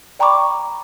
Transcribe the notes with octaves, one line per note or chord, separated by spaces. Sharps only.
D5 G5 A#5 B5 C#6 D6